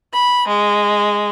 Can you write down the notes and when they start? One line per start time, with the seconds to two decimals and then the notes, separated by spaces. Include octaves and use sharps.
0.13 B5
0.47 G#3